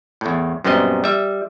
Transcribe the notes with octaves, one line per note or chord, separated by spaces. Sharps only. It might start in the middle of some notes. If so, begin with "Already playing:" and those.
E2 A2
F#2 A#2 G3 B3 C4 D#5
G3 E5